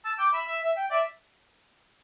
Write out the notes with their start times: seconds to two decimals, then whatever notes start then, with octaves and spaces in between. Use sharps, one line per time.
0.04 A5 E6
0.18 G5 D6
0.33 E5 B5
0.47 E5
0.61 E5
0.76 G5
0.90 D5 E5